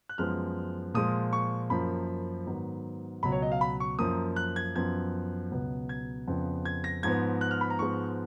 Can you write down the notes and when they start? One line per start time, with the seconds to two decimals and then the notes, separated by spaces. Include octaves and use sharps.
0.09 F#6
0.18 F#2 F3 G#3 B3 F6
0.94 A#2 F3 G#3 D#6
1.33 C#6
1.70 F#2 F3 A#3 B5
2.47 G#2 D#3 F#3 B3
3.23 C#2 B2 F#3 B5
3.32 C#5
3.42 D#5
3.52 F5
3.61 B5
3.80 C#6
3.99 F#2 F3 A#3 D#6
4.36 F#6
4.56 G#6
4.75 F#2 F3 B3 G#6
5.51 C#2 B2 F#3 B3
5.89 G#6
6.28 F2 C#3 F3 B3
6.65 G#6
6.84 A#6
7.03 G#2 F3 B3 G#6
7.41 F#6
7.51 F6
7.61 B5
7.70 A#5
7.79 G#2 F3 G#3 B3 C#6